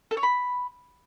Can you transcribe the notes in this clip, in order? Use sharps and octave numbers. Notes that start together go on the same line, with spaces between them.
A4
C#5
B5